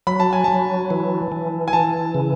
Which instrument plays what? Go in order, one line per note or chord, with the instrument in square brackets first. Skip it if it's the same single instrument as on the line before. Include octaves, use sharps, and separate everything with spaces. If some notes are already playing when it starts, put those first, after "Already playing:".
[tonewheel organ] F#3 [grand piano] B5
[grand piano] A5
G#5
[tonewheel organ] F#3 [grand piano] A5
[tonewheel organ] E3
E3
[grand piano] G#5
[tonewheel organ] E3 [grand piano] A5
[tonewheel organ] C#3